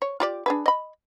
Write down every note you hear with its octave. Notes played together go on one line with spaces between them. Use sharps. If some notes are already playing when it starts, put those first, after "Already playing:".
C#5
F4 G4 D5
D4 G#4 B4
D#5 B5